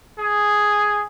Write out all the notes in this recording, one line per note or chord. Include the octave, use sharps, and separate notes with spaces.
G#4